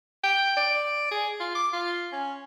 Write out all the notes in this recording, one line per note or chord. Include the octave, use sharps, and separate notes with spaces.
G5
D5
G#4
F4
D6
F4
C#4